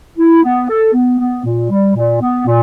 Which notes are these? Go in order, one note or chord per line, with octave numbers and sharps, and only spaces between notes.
E4
B3
A4
B3
B3
A#2
G3
A#2
B3
A#2